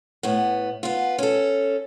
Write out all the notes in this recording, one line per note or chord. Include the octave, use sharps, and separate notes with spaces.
A2 B3
B3 F4
C#4 A4